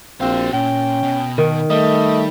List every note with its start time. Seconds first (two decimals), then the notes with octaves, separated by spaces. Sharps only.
0.21 A#1 C4 F#4 F5
0.53 A#2 C#4 G5
1.03 B2
1.38 D#3
1.70 G3 A3 D#5